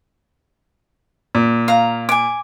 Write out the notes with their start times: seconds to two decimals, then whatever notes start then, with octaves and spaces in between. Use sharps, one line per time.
1.35 A#2
1.68 F5 A#5
2.09 G#5 D6